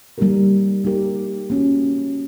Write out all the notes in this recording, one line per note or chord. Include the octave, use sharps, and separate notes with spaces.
G3 A#3 D#4 G4 A#4
G3 A#3 D#4 G4 A#4
A#3 C#4 F#4